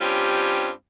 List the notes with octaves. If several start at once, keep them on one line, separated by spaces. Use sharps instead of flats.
G2 G3 C4 C#4 F4 G4